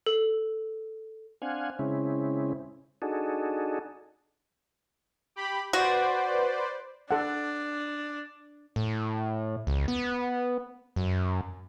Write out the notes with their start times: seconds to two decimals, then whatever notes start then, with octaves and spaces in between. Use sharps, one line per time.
0.06 A4
1.42 C4 D4 F5 F#5 G#5
1.79 C#3 G#3 C4 C#4 E4
3.02 D4 D#4 F#4 G#4 A4
5.36 G4 B5
5.73 F#4 B4 C5 D5
7.11 D4 A4 F#5
8.76 A2
9.67 C#2
9.88 B3
10.96 F#2